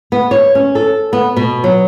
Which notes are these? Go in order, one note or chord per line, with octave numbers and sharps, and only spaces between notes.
B3
C#5
C#4
A4
B3
B2
F#3